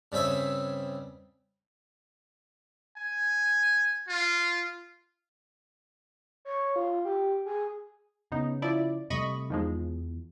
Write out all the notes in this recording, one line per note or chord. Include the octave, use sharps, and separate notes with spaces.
G2 C#3 C4 E5 G#5
G#5
F4
C#5
F4
G4
G#4
C#3 B3 D#4
F3 E4 D5
C3 G3 A3 D#5 B5 C#6
E2 D#3 F3 G#3